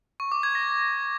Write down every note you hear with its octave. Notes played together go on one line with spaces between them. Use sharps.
C#6
D6
G#6
A#6